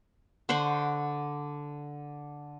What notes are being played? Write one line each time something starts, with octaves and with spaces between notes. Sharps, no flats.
D3 C5 F#5 C#6